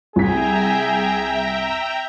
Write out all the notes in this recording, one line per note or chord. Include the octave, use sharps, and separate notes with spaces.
C2 G#4 E5 G5 A#5 B6